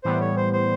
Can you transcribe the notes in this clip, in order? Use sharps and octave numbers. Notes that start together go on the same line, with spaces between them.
A2 E3 G3 B3 C5
C#5
C5
C5